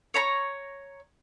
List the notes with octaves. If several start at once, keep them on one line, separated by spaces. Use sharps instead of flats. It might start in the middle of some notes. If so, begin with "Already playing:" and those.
C#5 A#5 B5 C#6